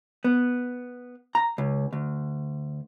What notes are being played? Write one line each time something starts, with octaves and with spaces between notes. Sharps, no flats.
B3
A#5
C#2
D2